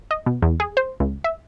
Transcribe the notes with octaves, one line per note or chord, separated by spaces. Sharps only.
D#5
B2
E2
G#4
C5
C#2
E5